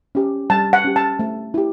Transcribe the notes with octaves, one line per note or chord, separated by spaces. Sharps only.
C#4 G4
G3 A5
F#5
C#4 G4
A5
A3
E4 G4